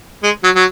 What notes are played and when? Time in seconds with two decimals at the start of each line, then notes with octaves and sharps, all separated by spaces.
0.23 G#3
0.43 F#3
0.55 F#3